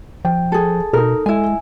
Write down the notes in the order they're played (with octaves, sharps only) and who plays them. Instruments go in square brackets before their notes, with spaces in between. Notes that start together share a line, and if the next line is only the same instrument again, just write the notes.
[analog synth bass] F3 [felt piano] G5
[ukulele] G#4 A4
[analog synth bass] B2 [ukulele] D#4 A#4 [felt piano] A4
[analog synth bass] G#3 [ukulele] E4 G#5